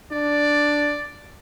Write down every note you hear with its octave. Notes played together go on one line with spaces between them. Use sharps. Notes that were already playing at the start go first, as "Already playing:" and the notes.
D4 D5